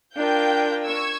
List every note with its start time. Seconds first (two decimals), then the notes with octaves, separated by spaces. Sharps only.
0.16 D4 F4 A#4 F5 G5 G6
0.85 C#6 E6 G#6